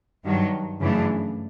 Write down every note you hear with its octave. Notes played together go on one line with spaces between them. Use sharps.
G2 D#3 F#3
F#2 C#3 E3 A3 D4